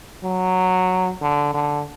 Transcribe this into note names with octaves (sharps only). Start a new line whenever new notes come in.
F#3
D3
D3